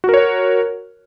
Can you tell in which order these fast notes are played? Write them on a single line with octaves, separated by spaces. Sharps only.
F#4 A#4 C#5